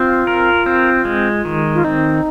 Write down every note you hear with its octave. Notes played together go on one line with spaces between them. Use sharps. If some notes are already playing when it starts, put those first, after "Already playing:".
Already playing: C4 F4
A#4
C4
G#3
D#3
F4
C4 D#4